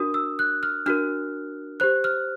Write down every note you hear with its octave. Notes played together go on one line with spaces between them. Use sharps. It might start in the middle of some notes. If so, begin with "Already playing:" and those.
Already playing: D4 F#4 A#4 D#6
E6
F#6
F6
D4 F#4 A#4 F6
G4 C5 F#6
F6